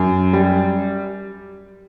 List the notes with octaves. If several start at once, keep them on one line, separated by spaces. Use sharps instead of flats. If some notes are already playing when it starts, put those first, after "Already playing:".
Already playing: F#2
G3